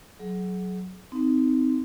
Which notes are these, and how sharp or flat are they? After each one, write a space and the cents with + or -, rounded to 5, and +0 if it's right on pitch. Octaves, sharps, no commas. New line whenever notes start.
F#3 +0 G#4 +35
C4 -20 D#4 +0